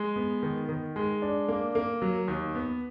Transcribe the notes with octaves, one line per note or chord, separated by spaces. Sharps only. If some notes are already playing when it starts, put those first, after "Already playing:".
Already playing: G#3
B3
D#3
D#3
G#3
D4
A#3
A#3
F#3
D#2
B3